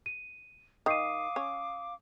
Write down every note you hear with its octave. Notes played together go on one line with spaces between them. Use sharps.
D#7
D#3 F5 D6 D#6 C7 D#7
C#4